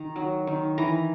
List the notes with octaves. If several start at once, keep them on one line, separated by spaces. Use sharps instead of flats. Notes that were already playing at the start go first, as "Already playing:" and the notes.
Already playing: D#3 A#5
F#3
D#3
E3 A#5